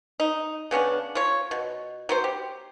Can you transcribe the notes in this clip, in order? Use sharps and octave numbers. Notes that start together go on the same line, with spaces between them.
D#4
C#3 B3 C#4 D4
F3 C#5
B2
F#3 B3 C5
G4